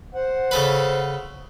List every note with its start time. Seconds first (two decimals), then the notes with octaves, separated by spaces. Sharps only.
0.15 C5 F#5
0.51 C#3 A4 B4